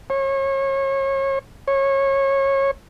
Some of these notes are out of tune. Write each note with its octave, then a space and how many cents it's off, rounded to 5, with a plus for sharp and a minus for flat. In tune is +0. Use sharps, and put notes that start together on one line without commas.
C#5 -35
C#5 -25